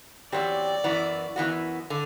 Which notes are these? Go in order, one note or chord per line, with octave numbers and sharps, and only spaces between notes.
E2 C3 F#3 C4 G4 D5
F#2 E3 B3 F#4
F#2 E3 B3 F#4
D3